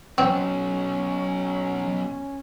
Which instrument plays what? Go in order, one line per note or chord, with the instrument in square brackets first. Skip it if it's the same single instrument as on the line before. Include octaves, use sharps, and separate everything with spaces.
[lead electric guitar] B2 F#3 [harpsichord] C4 [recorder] C#4